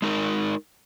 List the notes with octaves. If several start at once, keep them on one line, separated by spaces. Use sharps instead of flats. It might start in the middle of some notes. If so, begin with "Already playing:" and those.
G#3 D#4 A#4